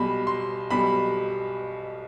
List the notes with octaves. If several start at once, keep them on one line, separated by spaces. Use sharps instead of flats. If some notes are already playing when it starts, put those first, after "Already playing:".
Already playing: B1 B2 G3 B5
C6
B1 B2 G3 B5